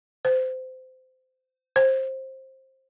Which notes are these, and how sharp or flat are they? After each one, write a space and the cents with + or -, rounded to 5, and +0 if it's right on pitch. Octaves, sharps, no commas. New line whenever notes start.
C5 -20
C5 +15